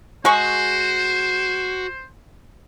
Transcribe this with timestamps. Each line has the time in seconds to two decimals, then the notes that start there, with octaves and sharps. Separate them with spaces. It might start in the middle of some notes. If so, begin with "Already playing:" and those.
0.25 G#3 F#4 G#4 C5 C#6